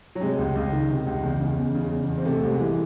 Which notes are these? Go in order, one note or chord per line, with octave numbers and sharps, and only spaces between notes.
F#3
C3 G#3
C#2
C#2
D#3
C3
C#2
E2
C#3
E2
C#3
E2
E2
C4
C3 A3
C2
G#3
E3